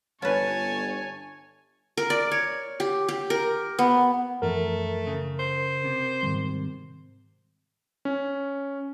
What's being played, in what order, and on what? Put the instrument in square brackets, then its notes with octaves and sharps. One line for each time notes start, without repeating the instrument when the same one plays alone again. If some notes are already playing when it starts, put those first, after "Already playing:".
[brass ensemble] G1 [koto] C#4 B4 [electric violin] C#5 G#5 [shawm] A5
[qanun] A#4
D5
C#5
G4
G4
A#4
B3
[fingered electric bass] F#2 E3 F3 [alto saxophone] A3 [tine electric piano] A#4
[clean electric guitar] C#3
[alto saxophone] C5
[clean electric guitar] C3
[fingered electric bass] G#2 D#3 G3
[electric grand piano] C#4